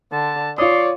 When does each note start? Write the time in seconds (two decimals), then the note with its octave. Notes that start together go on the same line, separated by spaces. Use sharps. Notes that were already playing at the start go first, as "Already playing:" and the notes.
0.12 D3 A5
0.58 F4 C#5 D5 C6 D#6